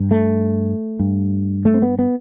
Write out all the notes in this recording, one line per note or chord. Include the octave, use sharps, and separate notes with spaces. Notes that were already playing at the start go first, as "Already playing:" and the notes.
Already playing: G2
A3
G2
A3
C4
B3
B3